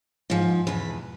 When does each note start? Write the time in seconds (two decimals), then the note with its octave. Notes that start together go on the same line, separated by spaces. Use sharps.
0.30 G#2 F3
0.67 E2 B2 B4